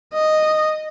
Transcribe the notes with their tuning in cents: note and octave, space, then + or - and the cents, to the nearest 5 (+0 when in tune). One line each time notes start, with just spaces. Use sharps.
D#5 -5